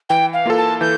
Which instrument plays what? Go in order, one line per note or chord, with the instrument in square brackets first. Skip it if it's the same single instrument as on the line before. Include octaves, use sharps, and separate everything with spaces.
[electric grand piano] E3 [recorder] G5
[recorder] F5
[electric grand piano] A#3 F4 A4
[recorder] A5
[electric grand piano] E3 [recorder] G6